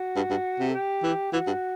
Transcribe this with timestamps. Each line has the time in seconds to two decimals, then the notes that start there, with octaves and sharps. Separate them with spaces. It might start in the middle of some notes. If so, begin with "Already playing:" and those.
Already playing: F#4
0.16 G2
0.30 G2
0.60 C3
0.69 A4
0.74 G4
1.03 E3
1.32 E3 F#4
1.47 G2